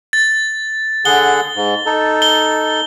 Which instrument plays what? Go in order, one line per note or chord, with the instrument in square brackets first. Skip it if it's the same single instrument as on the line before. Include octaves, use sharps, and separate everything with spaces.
[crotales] A6
[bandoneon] D3 G#4 F#5 [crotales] G7
[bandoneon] G#2
D#4 A4
[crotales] G7